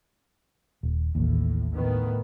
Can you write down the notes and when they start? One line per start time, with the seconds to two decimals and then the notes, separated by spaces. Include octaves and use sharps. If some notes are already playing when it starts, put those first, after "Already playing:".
0.83 D#1
1.15 A1 D#2 A2
1.74 A2 D#3 B3